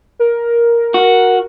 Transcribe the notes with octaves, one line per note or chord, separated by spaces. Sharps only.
A#4
F#4